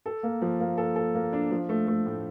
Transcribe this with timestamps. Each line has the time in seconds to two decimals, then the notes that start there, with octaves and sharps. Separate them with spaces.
0.06 A4
0.23 A#3
0.42 F3
0.60 A#3
0.78 A4
0.96 A4
1.15 A#3
1.33 D4
1.51 F3
1.69 A3
1.88 A3
2.06 A2